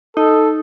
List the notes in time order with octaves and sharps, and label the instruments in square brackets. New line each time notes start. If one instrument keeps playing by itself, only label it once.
[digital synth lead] D#4 [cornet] A4